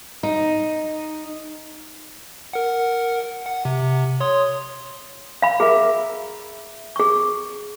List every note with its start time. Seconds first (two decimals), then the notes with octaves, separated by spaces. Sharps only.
0.23 D#4
2.53 A#4 F#5
3.46 F#5
3.65 C3
4.20 C#5 C6 D#6
5.42 F5 B5
5.60 G#4 A#4 E5
6.96 G#4 C#6